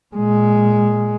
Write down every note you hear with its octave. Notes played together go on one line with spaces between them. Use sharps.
A#2 G#3